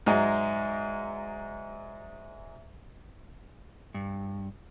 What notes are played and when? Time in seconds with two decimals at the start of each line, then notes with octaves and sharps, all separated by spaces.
0.06 G#2 F#3 G#3 D5 E5
3.94 G2